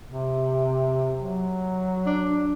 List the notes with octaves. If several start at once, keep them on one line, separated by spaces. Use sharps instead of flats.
C3
F#3
D4